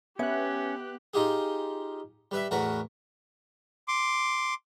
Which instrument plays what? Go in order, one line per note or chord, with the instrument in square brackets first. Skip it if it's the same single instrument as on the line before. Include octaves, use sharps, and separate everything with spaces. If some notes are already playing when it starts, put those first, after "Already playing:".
[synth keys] B3 F#6 [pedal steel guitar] C#4 [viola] G4 [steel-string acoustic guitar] E5
[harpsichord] D#4 F4 G4 G#4
G3 B4 E5
E2 A2 F#4 A#4 B4
[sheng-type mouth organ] C6 D6